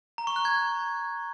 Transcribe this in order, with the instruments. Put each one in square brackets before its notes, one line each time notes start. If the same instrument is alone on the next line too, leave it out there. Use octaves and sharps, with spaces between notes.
[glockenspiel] A#5
C#6
F#6
G#6